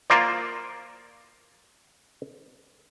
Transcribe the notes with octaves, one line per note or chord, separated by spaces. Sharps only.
A#3 F4 A#4 C5 D5